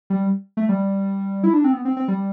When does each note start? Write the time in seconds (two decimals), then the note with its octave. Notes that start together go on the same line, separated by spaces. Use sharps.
0.10 G3
0.57 A3
0.69 G3
1.44 E4
1.53 D4
1.64 C4
1.73 B3
1.85 C4
1.97 C4
2.08 G3